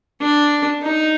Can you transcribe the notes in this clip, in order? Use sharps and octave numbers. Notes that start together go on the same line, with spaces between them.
D4
D#4